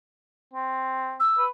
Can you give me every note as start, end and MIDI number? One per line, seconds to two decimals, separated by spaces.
0.53 1.16 60
1.20 1.45 88
1.38 1.48 71